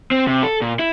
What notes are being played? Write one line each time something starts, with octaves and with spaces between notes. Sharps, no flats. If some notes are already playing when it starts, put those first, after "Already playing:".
C4
C3
A4
A#2
E4